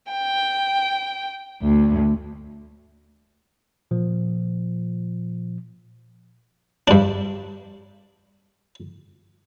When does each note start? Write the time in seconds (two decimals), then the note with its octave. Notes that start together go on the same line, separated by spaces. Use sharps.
0.11 G5
1.62 D2
3.91 A#2 F3
6.88 G2 D4